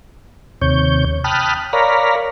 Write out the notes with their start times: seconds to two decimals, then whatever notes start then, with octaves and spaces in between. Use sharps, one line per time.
0.61 D#2 C3 C#5 G6
1.24 G5 A5 B5 D#6 F6 F#6
1.73 A#4 C#5 D5 F5 A#5 B5